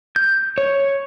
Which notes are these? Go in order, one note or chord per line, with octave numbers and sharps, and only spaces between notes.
G6
C#5